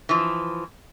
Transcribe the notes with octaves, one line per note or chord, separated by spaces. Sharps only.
E3 F3